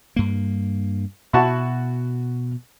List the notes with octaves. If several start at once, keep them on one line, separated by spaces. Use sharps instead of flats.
G2 A#3
B2 E4 F#4 A5